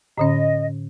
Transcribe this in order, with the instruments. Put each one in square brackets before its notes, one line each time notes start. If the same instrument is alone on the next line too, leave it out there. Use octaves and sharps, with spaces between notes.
[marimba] A2 D3 C#4 [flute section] D#5